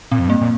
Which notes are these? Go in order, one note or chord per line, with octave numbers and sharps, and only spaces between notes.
A#2 C4
F2
G2
A#3
A#2